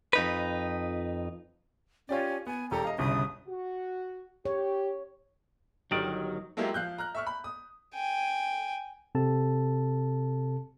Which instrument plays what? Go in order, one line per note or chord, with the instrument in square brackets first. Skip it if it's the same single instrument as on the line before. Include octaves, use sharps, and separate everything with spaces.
[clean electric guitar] F2 D#4 B4
[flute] C#4 [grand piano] F4 G4 D5
[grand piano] B3 [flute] G#5
[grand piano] E1 G4 A4 [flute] A#5
[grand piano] D#5 F5
[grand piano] G1 C2 C#3 [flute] D#6
[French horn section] F#4
[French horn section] G4 [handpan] C#5
[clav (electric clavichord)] G1 D#3 D5 [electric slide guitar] F#3 [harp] D#4 G4
[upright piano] F#3 G#3 A#3 E4 F4 G4
F3 F5 F#6 G6
A#5 F6 F#6
E5 C#6 F6
B5
D#6
[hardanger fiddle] G5 G#5
[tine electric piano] C3 C4 A4 A5